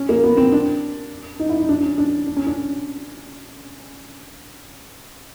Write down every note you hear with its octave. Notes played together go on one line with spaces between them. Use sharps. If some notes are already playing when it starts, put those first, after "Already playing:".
Already playing: C#4
A#3
B3
C4
D4
D#4
E4
D#4
D4
C#4
D4
D4
C#4
D4